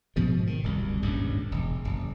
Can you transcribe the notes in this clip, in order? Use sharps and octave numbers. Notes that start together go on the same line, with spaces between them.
G#2 B2 F3 G#3
D#3
D1 C2 F#2
G#1 C#2 G2 A#2
E1
F#1